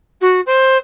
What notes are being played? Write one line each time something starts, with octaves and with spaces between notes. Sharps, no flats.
F#4
C5